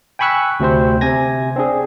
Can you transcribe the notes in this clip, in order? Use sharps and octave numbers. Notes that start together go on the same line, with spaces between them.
G5 G#5 B5 C#6 E6 F#6
D2 C3 C4 C5
C3 G#5 G#6 A#6
C4 D4 G#4